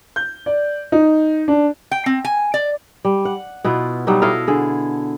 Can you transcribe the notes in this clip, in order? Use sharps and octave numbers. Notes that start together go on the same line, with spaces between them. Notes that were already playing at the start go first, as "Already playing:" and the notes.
G6
D5
D#4
D4
G5
C4
G#5
D5
G3
F#5
B2 B3 E4 F4
B2 F#3 G3 D#4
E4 A4 D#5 F5
D3 G#4 A4